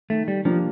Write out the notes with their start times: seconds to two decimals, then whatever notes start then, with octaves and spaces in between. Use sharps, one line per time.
0.10 D#3 A3
0.28 G3
0.45 F3 G3 A#3 D4 F4